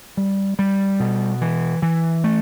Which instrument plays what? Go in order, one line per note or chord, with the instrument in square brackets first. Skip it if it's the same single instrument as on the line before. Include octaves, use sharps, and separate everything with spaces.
[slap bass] G3
G3
B2
E3
E3
A3